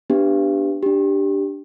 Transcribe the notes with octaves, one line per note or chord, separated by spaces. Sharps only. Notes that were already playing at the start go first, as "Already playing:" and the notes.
B3 D4 G4
D4 G4